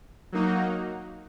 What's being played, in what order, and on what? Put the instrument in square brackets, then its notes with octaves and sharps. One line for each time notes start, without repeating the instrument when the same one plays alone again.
[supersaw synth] F#3 A#3 D#4 F#4